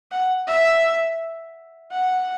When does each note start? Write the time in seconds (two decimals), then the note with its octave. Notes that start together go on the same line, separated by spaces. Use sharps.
0.11 F#5
0.47 E5
1.91 F#5